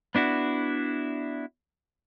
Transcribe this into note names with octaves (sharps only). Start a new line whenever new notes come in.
B3 D4 E4 F#4